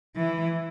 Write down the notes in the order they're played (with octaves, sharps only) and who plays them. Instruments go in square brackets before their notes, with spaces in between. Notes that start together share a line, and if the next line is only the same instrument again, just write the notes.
[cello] E3